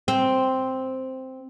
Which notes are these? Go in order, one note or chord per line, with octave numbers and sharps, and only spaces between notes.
C4